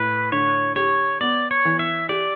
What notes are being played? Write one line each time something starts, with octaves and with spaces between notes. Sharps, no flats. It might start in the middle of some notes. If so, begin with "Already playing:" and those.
Already playing: A2 B4
D3 C#5
G4 C#5
B3 D5
C#5
E3
E5
G4 D5